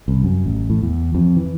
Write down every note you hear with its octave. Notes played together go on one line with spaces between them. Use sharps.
C2
F#2
A1
A2
E2
F2
E3